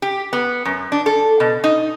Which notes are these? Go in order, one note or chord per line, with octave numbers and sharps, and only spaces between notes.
G4
B3
F#2
D4
A4
B2
D#4